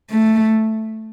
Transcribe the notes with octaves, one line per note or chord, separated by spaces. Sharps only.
A3